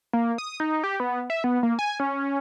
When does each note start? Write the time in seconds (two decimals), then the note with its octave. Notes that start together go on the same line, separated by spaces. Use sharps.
0.13 A#3
0.38 D#6
0.60 D#4
0.84 G4
1.00 B3
1.30 E5
1.44 B3
1.63 A#3
1.79 G#5
2.00 C#4